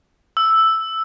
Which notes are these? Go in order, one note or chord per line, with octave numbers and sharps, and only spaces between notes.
E6